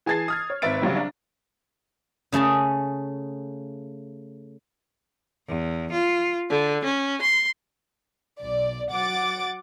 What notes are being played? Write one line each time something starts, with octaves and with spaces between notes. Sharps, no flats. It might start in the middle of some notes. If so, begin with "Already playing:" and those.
E3 G#4 A5 G#6 A6 C7
D#6 F6 G#6
C#5
G#1 B4 E5 A6 D7
A#1 C#3 F#3 G3
D4 A#5
C#3 A3 G#4 A5
E2
F4
D3
C#4
C6
B1 D5
F#3 F#5 D6 A6